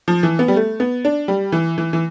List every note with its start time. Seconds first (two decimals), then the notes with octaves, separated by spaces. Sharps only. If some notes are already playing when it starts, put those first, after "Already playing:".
0.08 F3
0.23 E3
0.39 B3
0.48 G3
0.56 A3
0.80 B3
1.05 D4
1.28 G3
1.52 E3
1.78 E3
1.93 E3